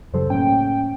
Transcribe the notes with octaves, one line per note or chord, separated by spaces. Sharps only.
F#2 C#3 F#3 G3 A4 C5
A2 A#3 C#4 G5